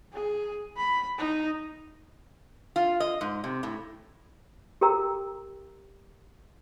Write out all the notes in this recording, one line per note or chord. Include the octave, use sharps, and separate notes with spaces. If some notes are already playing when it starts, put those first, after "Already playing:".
G#4
B5
D#4
F4
D#5
G#2
C3
A2
G4 A4 A#4 G5 A#5 E6